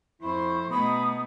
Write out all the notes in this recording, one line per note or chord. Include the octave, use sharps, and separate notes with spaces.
F2 E4 C5 C#6
B2 A3 D#4 B5 D#6